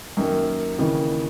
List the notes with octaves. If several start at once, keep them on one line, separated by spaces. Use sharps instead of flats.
F#2 D#3 A#3
D#2 C#3 E3 A#3 D#4